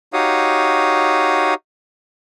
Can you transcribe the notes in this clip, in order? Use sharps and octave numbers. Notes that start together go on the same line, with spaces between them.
D#4 F#4 G4 C#5 F5 D#6